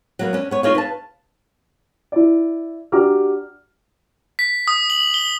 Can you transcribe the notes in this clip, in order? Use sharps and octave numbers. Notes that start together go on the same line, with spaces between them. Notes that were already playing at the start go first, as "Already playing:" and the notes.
F#3 A#3 B3
C#4 D4
B3 C#5
D#4 F4 G#4 C#5 D5 F5
B4 F5 A5
E4 D5
D4 F#4 G4 A#5 D6 F6
B6
D#6
F#7
G7